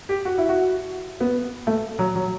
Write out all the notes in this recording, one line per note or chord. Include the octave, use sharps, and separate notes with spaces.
G4
F#4
E4
F#4
B3
A3
F#3
F#3